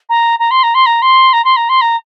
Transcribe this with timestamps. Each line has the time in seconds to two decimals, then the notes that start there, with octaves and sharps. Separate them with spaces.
0.09 A#5
0.39 A#5
0.51 C6
0.63 A#5
0.74 C6
0.86 A#5
1.02 C6
1.33 A#5
1.44 C6
1.56 A#5
1.69 C6
1.81 A#5